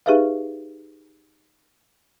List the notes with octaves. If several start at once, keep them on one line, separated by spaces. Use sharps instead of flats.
D#4 G4 G#4 B4 E5 F5